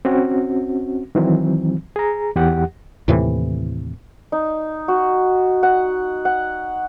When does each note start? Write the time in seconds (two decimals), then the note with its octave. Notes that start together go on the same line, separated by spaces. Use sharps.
0.05 C4 C#4 F#4
1.15 D#3 E3 F#3 C4
1.96 G#4 A#5
2.36 E2 G4 F#5
3.08 D#2 A2 C3 E3
4.32 D#4
4.88 F#4
5.63 F#5
6.25 F#5